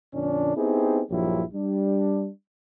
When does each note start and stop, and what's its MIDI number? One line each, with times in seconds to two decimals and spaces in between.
0.14 0.54 41
0.14 0.54 46
0.14 0.54 50
0.14 0.54 61
0.14 0.54 62
0.56 1.02 59
0.56 1.02 60
0.56 1.02 63
0.56 1.02 64
0.56 1.02 67
0.56 1.02 68
1.11 1.43 34
1.11 1.43 43
1.11 1.43 53
1.11 1.43 54
1.11 1.43 64
1.11 1.43 67
1.54 2.30 55
1.54 2.30 62